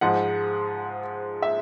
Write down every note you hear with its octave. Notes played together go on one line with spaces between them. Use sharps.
G#2 F3 G#3 F#5
E5